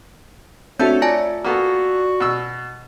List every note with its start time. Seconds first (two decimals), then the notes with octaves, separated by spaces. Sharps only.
0.79 A3 C4 D4 E4 F#4 A4 C#5 G6
1.02 F4 D5 G#5 A5
1.44 A#3 B3 F#4 A4
2.20 B2 E6